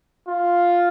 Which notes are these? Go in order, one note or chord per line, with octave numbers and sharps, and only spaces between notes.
F4